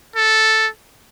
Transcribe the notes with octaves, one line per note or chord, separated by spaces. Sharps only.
A4